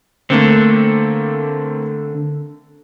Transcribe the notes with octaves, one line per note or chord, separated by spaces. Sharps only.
D3 A3 A#3 C4